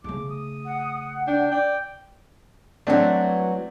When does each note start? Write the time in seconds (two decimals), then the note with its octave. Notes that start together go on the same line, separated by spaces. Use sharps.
0.04 C#3 A3 D6
0.30 D#6
0.65 F#5
1.27 D4 G5
1.52 D5 G5
2.87 E3 F#3 A3 C4 D4